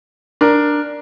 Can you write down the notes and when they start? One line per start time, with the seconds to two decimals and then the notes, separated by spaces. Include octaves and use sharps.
0.41 D4 A#4